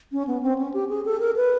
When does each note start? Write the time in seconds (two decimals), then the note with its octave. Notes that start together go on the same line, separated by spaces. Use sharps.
0.12 C#4
0.27 B3
0.43 C4
0.58 C#4
0.74 G4
0.89 G#4
1.05 A4
1.20 A#4
1.36 B4